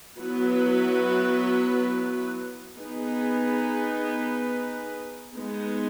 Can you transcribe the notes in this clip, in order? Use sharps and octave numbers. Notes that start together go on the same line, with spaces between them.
F#3 B3 E4 B4
B3 D#4 G#4 B4
G#3 B3 D#4